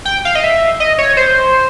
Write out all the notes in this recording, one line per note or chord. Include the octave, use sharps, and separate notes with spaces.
G5
F5
D#5
E5
D#5
C#5
C5